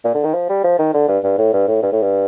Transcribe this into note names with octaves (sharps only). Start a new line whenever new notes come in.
A#2
D3
D#3
F3
G3
F3
D#3
D3
G2
G2
A2
G2
A2
G2
A2
G2